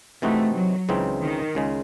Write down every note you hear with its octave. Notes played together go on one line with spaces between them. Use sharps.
C3 E3 A3 C4 D#4 F#4
F#3
C#2 C#3 E3 C4 D#4
D#3
C#2 C#3 G#3